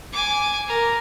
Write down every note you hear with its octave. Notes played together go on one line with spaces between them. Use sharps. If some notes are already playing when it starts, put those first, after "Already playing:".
G#5 D6
A#4